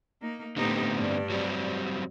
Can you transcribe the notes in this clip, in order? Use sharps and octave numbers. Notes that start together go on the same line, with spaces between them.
A#3 D#4
A2 D3 B3 C4 D#4 G4
G2 D5
F#3 G3 C4